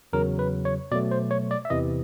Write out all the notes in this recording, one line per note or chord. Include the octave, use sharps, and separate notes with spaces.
E2 C#3 F#3 A#4
B4
C#5
B2 F#3 A3 D5
C5
C#5
D5
E5
E2 C3 E3 D#5